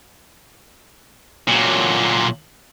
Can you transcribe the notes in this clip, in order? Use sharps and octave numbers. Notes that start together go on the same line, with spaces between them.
A#2 F#3